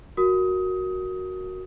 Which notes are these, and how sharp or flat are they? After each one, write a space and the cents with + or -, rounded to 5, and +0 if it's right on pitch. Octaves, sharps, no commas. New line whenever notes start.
F#4 +0 A#4 +0 D#6 +20